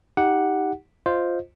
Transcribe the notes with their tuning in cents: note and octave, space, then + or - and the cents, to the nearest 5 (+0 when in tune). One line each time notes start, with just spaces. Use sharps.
D#4 +25 G4 +0 F#5 +0
F4 +0 C5 +0 D#5 +0